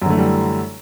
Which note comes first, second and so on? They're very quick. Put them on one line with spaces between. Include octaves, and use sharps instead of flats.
F#2 D3 A3 E3 G3